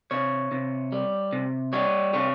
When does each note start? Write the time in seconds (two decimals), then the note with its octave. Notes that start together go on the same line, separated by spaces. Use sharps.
0.11 C3 C#5
0.52 C3
0.92 G3
1.33 C3
1.73 G3 C#5
2.14 C3 C#5